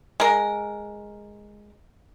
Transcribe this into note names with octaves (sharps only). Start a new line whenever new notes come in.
G#3 A#4